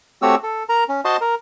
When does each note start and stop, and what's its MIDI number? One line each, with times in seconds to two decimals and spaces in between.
0.22 0.35 57
0.22 0.35 60
0.22 0.35 66
0.22 0.35 67
0.22 0.35 73
0.22 0.35 88
0.43 0.63 69
0.69 0.84 70
0.69 0.84 82
0.89 1.01 61
1.05 1.17 66
1.05 1.17 72
1.05 1.17 75
1.05 1.17 81
1.05 1.17 84
1.21 1.35 70